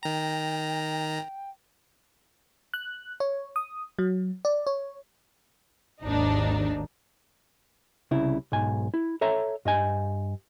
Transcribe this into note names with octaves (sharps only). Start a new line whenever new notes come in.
D#3 G5 A#5
F#6
C#5
D#6
F#3
D5
C#5
G#1 D#2 G#2 D4 D#4
C2 C#3 E4
B1 G#2 G#5
E4
A4 C#5 E5 A#5
G2 D#5 G#5